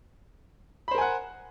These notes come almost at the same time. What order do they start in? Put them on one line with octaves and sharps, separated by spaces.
B5 C5 A#4 G#5 F#5